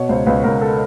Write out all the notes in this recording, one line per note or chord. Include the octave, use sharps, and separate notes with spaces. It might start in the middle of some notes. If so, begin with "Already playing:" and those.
Already playing: B2 C#5
C#2 C5
C#2 B4
C#2 A#4
A4